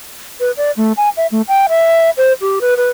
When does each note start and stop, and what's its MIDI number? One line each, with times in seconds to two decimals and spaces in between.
0.40 0.51 71
0.57 0.71 74
0.77 0.93 57
0.97 1.09 80
1.17 1.27 76
1.32 1.42 57
1.48 1.66 79
1.69 2.10 76
2.17 2.33 72
2.41 2.59 67
2.61 2.74 71
2.77 2.89 71